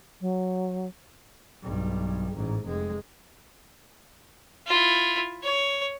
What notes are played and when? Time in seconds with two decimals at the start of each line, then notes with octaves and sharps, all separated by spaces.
0.20 F#3
1.63 B1 G2
2.34 A1 G#2
2.65 F1 G#3
4.67 E4 F4
5.43 C#5